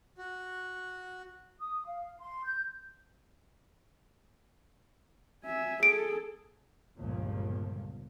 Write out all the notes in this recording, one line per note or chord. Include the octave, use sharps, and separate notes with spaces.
F#4
D#6
F5
C6
G6
E5 G#5
G#4 A4 D7
G1 C#2 G2 A#2 F3